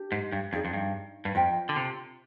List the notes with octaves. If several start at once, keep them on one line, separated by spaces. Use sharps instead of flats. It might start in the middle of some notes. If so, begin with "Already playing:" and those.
Already playing: D4 G4
G#2
G2
F2 D#4 G#4 D5
F2
G2
G2
F2 F4 C5 G5
D3
C3